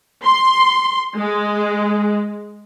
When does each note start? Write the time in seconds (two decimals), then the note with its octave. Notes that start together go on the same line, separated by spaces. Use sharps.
0.25 C6
1.16 G#3